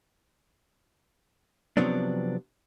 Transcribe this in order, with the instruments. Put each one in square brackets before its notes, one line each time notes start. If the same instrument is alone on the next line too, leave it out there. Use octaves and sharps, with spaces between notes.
[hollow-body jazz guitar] C3 F3 F#3 B3 C4 D4